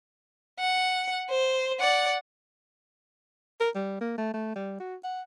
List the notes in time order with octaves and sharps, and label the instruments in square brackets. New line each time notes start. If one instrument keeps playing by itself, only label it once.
[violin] F#5
C5
D5 F#5
[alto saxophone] A#4
G3
A#3
A3
A3
G3
F#4
F#5